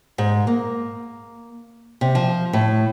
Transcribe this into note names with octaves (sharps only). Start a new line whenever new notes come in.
G#2
A#3
C3
F3
A2